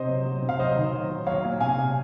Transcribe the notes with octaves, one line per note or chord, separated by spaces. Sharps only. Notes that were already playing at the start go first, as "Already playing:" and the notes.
Already playing: C3 C5 D#5
F#3
F#3
C3
F5
F#3 C5 D#5
D#3
F#3
F#3
F#3 C#5 F5
A#2
C3 F5 G#5
C3